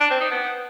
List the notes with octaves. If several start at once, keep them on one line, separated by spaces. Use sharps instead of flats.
D4
C4
D#4
B3